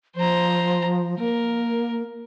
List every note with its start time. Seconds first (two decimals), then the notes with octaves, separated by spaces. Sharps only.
0.15 F3 C5 A#5
1.19 A#3 A#4